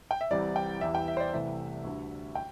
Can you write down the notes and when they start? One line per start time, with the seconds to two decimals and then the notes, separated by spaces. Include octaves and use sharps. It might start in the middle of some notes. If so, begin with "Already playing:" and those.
0.11 G5
0.21 E5
0.31 C2 C3 E3 G3 D5
0.56 G5
0.81 E2 E3 G3 E5
0.95 G5
1.08 E5
1.17 C5
1.20 D5
1.33 C2 C3 E3 A3 E5
1.85 D2 D3 G3
2.35 G5